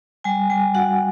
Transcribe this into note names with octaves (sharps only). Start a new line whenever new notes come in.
G3 G#5
G3 G#5
F#4 F#5